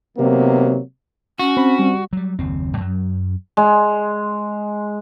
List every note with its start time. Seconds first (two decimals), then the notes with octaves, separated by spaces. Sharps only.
0.18 C3 D#3 F#3 A#3 B3
1.39 C#4 F#4
1.57 C4 B5
1.79 G3
2.13 F#3 G3
2.39 F#1 D#2 C4
2.77 F#2 F#3
3.57 G#3